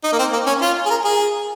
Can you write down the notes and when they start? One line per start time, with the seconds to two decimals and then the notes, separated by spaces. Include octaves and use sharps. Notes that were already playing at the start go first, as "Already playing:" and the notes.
0.04 D#4
0.12 A#3
0.19 C4
0.33 A#3
0.47 C#4
0.61 F4
0.86 G#4
0.90 A#4
1.05 G#4